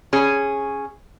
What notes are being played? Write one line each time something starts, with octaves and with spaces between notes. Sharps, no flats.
C#4 G#4